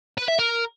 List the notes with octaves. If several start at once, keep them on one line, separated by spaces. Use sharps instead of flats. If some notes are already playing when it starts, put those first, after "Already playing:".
B4
E5
A#4